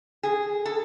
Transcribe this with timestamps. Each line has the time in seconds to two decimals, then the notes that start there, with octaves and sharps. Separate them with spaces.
0.23 G#4
0.65 A4